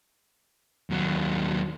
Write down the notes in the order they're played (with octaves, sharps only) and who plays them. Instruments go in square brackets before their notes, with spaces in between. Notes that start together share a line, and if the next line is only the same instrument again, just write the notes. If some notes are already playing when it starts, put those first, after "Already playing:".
[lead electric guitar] D#2 F#3